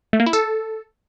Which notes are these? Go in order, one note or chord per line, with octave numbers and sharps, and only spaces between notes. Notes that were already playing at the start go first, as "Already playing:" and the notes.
A3
A#3
E4
A4